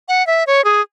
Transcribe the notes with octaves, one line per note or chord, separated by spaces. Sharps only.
F#5
E5
C#5
G#4